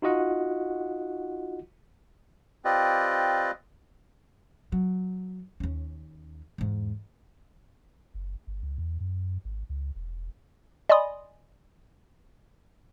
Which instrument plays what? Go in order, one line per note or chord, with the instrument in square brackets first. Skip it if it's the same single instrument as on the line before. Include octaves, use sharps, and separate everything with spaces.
[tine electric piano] D#4 F4 F#4 D#5 F#5
[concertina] C4 F4 G4 B4 D5 D#5
[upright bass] F#3
D#2 C#4
E2 G#2
[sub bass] F#1
G1
C#2
E2
F#2
G#1
C#2
E1
[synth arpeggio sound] D5 D#5 G#5 B5 C6 D#6